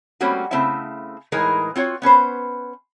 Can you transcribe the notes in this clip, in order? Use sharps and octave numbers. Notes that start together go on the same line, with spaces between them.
G3 A3 A#3 C4 C#4 F#4
C#3 A3 C4 E4 E5
A2 E3 G#3 D#4 G#4 A#4
C4 F4 F#4 C#5
B3 C#4 B4 C5